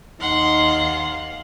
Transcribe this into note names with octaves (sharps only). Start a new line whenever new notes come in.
D#2 D#4 F5 F#5 C6